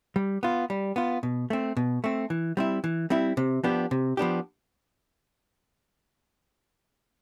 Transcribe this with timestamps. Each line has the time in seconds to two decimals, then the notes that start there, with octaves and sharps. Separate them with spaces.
0.16 G3
0.43 B3 F4
0.70 G3
0.96 B3 F4
1.23 B2
1.50 A3 C4
1.77 B2
2.04 A3 C4
2.30 E3
2.57 G3 C4 E4
2.84 E3
3.10 G3 C4 E4
3.37 C3
3.64 F3 B3 D4 G4
3.91 C3
4.17 F3 B3 D4 G4